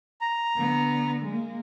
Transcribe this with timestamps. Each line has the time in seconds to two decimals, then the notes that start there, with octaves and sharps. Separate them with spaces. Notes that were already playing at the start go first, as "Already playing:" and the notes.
0.21 A#5
0.57 D3 B3
1.25 G#3 A#3